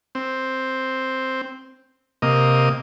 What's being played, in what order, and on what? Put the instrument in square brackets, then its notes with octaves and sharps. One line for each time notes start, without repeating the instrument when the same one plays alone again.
[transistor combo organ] C4
C3 A#3 D#5